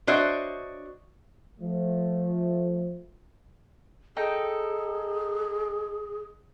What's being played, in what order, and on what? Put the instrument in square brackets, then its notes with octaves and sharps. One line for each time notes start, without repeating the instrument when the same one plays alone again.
[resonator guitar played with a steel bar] D4 F#4 C5 C#5 D#5 E5
[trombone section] F3 A3
[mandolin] D#4 A4 G5 [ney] G#4